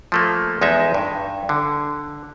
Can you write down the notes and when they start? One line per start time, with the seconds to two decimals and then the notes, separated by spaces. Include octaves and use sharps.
0.12 F3 A3 A#3
0.61 E2 G#3 D#4 E5
0.94 G2
1.49 D3